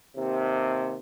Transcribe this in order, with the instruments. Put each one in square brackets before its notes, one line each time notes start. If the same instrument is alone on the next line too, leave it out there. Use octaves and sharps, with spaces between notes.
[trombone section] D#2 C3